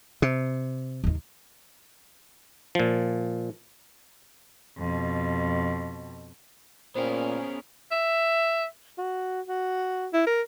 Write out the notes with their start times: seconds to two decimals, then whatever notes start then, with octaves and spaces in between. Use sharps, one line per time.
0.22 C3
1.04 D#2 D#3
2.75 A#2 F3
4.78 F2 B2
6.96 A#2 B3 C#4 G#4 A#4 C5 G5
7.91 E5
8.98 F#4
9.48 F#4
10.13 E4
10.27 A#4